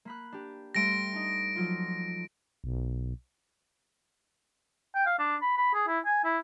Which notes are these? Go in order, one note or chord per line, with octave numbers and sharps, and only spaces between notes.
A#3 B5 F#6
D4 G4
G3 A3 C5 A#6 D7
D4 D#4
F3 F#3 F4
B1
G5
F5
D4
B5
B5
G#4
E4
G#5
E4